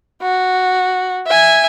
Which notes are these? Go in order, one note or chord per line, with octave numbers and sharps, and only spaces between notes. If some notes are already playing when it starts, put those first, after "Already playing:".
F#4
E5 G#5